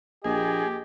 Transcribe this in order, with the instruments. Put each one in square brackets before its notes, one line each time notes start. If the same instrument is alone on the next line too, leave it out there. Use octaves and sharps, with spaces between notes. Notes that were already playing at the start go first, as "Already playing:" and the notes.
[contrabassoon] A#1 [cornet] G4 [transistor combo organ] G#4 [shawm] D#5